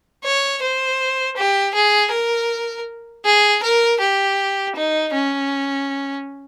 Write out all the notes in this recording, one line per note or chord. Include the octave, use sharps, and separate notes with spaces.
C#5
C5
G4
G#4
A#4
G#4
A#4
G4
D#4
C#4